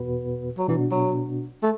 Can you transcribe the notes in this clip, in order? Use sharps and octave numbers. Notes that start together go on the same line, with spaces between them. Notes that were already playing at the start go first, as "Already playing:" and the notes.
Already playing: E2 B2 B3 F#4 B4
F#3
B2 E3 B3 D4 F#4
F#3
A3